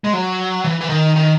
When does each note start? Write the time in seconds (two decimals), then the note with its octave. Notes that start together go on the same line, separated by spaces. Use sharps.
0.04 G#3
0.13 F#3
0.64 E3
0.81 E3
0.89 D#3
1.16 D#3